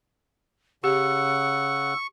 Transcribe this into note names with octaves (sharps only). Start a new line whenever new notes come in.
C#3 G4 F#5 C#6 E6